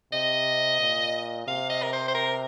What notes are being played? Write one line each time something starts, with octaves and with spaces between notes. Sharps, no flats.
C3 D#5
A#2
C3 F5
D#5
A#4
C5
C5
A#4